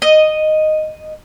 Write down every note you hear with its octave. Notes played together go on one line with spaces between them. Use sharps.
D#5